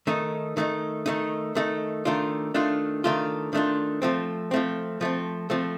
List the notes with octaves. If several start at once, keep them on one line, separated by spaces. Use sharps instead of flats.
D#3 A3 D#4
D#3 A3 D#4
D#3 A3 D#4
D#3 A3 D#4
D#3 A3 D4 F4
D#3 A3 D4 F4
D#3 A3 D4 F4
D#3 A3 D4 F4
F3 A3 C4
F3 A3 C4
F3 A3 C4
F3 A3 C4